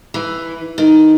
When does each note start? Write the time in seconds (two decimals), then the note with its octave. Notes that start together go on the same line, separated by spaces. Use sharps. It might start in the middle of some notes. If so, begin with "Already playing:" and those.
0.14 E3
0.78 D#3